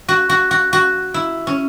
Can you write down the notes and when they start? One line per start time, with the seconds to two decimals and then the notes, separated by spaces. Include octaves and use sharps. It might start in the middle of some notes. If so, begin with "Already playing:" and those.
0.08 F#4
0.30 F#4
0.51 F#4
0.73 F#4
1.14 E4
1.47 C#4